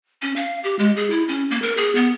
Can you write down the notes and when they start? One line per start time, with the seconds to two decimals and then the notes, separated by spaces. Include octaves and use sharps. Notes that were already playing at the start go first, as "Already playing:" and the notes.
0.22 C#4
0.36 F5
0.64 G4
0.79 G#3
0.96 G#4
1.10 E4
1.28 C#4
1.51 A#3
1.62 A#4
1.77 G#4
1.95 B3